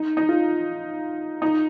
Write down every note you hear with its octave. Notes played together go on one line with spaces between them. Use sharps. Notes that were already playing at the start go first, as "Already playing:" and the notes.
Already playing: D#4
D#4
F4
D#4